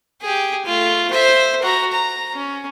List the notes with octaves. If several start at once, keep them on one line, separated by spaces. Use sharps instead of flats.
G4 G#4
A3 F4
C5 E5
F#4 A#5
A#5
C#4